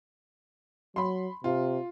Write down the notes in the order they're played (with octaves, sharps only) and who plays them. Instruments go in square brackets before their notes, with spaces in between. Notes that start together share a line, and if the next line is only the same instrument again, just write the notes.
[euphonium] F#3 [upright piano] B5 C6
[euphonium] C3 [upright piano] F4